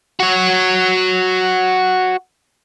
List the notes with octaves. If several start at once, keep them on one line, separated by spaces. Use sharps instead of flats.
F#4 C#5